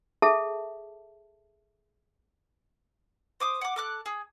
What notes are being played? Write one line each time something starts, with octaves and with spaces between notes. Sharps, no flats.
G#4 A4 E5 A5
C5 D6 D#6
F#5 D6
A4 D6 F#6
G#4